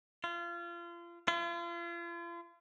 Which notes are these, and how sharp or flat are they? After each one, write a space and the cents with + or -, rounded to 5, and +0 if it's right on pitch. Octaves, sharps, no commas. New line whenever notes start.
F4 -30
F4 -40